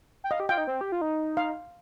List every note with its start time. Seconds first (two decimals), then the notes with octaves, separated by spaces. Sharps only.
0.24 G5
0.31 D#5 F5
0.40 G4
0.49 F4 G5
0.58 D#4
0.67 C4
0.81 G4
0.92 F4
1.01 D#4
1.37 F5